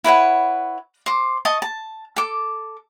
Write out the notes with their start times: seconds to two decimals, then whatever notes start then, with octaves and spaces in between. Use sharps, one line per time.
0.04 E4 B4 C#5 F#5
1.06 C5 D6
1.45 D#5 A5 C#6
1.62 A5
2.16 A4 D6